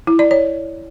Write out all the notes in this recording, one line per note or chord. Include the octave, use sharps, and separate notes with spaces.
E4
D5
C#5